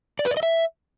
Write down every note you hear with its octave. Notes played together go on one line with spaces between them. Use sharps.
D5
B4
D5
D#5
E5